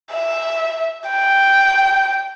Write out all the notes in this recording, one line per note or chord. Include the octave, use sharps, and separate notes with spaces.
E5
G5